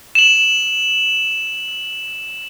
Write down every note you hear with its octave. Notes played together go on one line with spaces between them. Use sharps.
E7 F#7